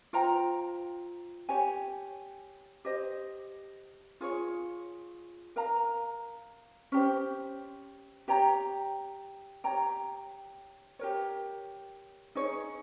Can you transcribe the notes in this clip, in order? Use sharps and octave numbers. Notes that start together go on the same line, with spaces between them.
F4 C5 G5 A#5
G4 C#5 G#5
G4 C5 D#5
F4 G#4 C#5
A#4 F5 A#5
C#4 G4 C5
G4 C#5 G5 A#5
G4 C#5 G5 A#5
G4 A#4 C#5
D#4 G#4 C#5